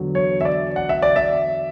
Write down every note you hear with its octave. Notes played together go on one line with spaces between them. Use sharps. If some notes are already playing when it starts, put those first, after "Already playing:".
Already playing: E2 D3 F#3
C#5
E5
D5
F#5
E5
D5
E5